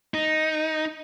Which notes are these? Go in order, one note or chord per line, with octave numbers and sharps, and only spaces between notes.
D#4